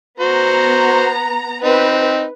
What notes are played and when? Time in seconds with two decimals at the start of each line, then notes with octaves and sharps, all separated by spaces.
0.20 B3 F#4 C5 A#5
1.64 C4 D#4 B4